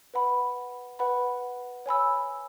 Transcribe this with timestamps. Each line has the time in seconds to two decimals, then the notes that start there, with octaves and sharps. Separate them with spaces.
0.14 B4 F#5 B5
0.99 B4 F#5 B5
1.86 C#5 G#5 B5 E6